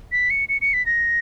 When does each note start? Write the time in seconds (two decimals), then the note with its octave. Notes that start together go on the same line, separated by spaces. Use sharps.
0.12 B6
0.30 C#7
0.49 C#7
0.62 C#7
0.74 B6
0.86 A#6